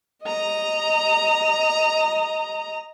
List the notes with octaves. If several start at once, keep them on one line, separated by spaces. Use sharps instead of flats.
D#5 A#5